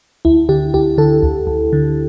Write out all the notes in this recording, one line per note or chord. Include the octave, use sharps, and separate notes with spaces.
D2 E4
D3 G4
D2 G4
D3 A4
D2
D2
D3